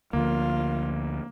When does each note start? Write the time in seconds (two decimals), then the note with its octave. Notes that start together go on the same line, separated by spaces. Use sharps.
0.13 D2 D3 F3 A#3 F4